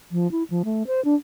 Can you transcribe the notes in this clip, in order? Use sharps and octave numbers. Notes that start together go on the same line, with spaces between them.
F3
E4
F3
A3
C5
D4